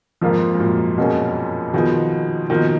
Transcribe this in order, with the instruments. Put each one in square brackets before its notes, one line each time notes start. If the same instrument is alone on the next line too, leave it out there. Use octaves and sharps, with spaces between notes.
[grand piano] F2 G#2 [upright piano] F3 A#3 F4
[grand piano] G#2
F#2 A#2
[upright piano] B2 A#3 C#4 G#4
[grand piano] B2 D#3 [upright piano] F3 B3 F4 G#4
[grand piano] B2 D#3 [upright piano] F3 A#3 F4 A#4